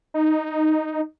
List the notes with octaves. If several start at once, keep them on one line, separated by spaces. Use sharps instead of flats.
D#4